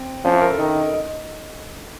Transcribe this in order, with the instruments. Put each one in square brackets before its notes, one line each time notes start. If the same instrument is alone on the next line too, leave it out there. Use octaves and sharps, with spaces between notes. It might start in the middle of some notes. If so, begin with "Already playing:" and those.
Already playing: [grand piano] C4
[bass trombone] F3 [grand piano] C#4
[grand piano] E4
A#4
A4
[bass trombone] D#3 [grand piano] D#4
[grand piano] D#4